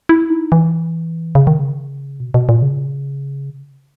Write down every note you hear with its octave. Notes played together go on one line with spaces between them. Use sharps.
E4
D#4
E3
C#3
D#3
C#3
B2
B2
A#2
C#3